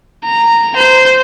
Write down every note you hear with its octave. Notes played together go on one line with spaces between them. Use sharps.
A#5
C5